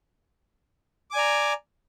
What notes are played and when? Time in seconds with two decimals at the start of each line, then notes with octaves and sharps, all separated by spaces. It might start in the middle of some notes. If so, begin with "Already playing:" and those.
1.11 D6
1.13 G#5
1.16 D5
1.18 A#5